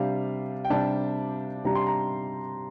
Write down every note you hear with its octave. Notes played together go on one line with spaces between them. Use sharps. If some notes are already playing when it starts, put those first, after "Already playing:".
Already playing: C3 G3 D4 F5
G5
C3 G3 D4 A5
C3 G3 D4 A#5
C6
A#5